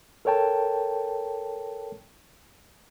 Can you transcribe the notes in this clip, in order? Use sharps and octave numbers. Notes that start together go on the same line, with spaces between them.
A4 A#4 C#5 G5 A5